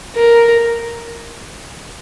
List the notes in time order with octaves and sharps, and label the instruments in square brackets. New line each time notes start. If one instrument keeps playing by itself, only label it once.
[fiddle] A#4